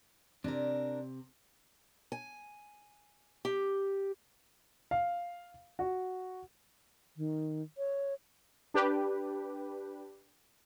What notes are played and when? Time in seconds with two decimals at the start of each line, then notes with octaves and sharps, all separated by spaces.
0.44 C3 D4 A#4
2.12 G#5
3.45 G4
4.91 F5
5.79 F#4
7.17 D#3
7.78 C#5
8.74 D4 G4 B4